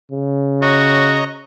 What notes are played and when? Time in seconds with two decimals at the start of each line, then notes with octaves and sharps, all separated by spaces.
0.11 C#3
0.62 F#4 C#5 D#5 A#5